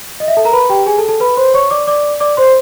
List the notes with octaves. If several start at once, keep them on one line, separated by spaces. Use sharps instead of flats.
D#5
E5
A4 A5
A#4 A#5
B4 B5
G4 G5
G#4 G#5
A4 A5
A4 A5
B4 B5
C5 C6
C#5 C#6
D5 D6
D5 D6
D5 D6
C5 C6